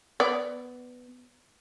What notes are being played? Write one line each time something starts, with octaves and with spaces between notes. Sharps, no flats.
B3 D5